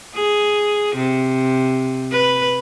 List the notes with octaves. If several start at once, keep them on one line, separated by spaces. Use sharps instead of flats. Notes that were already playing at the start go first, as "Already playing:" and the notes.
G#4
C3
B4